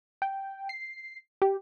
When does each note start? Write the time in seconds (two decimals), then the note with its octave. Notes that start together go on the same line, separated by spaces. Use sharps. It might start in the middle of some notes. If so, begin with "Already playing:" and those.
0.22 G5
0.69 C7
1.42 G4